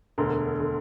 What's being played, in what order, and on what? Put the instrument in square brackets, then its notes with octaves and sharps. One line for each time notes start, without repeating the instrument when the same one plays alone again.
[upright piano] E1 D2 D3 A#4
D3